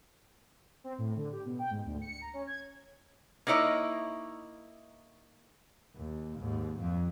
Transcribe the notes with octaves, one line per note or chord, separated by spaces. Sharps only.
C4
A2
D3
G4
B2
G5
G#2
D2
C#7
A#5
C#4
G#6
A#3 D#4 E4 C#5 D#5
D#2
D#2 G#2
F2 F3